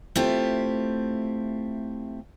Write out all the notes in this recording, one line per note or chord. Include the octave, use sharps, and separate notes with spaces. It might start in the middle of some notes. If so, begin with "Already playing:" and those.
A3 C4 E4 F4 G4